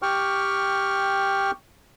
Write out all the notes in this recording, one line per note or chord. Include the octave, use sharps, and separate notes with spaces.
G4 G5 C#6 F6